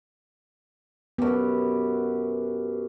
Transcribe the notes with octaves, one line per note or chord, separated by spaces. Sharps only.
F#2 B3 G4